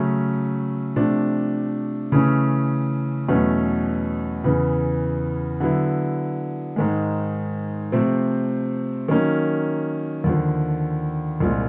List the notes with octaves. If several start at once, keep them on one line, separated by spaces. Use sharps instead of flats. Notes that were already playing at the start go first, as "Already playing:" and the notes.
Already playing: C#3 F#3 A3 C#4
C3 F3 A3 D4
C#3 E3 A3 C#4
E2 B2 F#3 A3 C#4
E2 C#3 E3
D3 F#3 B3 E4
G#2 D#3 G#3
C3 F3 A3 C4
D#3 F#3 A#3 C#4
D#2 D3 F3
C2 A#2 F3 G#3